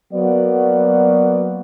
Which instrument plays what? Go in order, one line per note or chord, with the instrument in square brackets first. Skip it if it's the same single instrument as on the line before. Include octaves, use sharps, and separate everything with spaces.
[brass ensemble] F#3 A#3 B3 F#4 D5